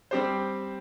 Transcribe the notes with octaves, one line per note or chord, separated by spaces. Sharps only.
G3 C4 G4 C5